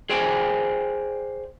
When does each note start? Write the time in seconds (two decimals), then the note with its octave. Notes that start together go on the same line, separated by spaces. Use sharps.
0.10 G#4 C5 D5 G5 G#5